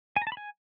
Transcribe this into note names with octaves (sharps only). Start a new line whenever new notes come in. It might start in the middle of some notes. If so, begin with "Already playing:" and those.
G#5
A#5
A5
B5
G#5